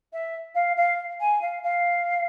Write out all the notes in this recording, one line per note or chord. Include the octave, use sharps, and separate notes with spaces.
E5
F5
F5
G#5
F5
F5